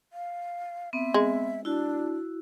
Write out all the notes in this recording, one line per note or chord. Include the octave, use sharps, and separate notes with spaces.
F5
B3 C4 E5
G#3
D4 E4 F#4